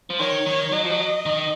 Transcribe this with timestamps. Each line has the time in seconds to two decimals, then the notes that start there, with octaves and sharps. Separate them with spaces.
0.10 F3
0.20 D#3 C#5
0.47 D#3
0.72 F#3 D#5
0.86 F3
0.91 F#3
1.26 D#3